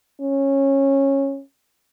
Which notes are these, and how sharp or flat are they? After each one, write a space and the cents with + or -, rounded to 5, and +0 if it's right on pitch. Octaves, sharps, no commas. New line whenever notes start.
C#4 -15